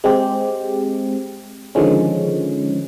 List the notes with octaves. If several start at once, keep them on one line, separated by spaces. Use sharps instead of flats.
G#3 C4 G4
D3 D#3 F3 G#3 C#4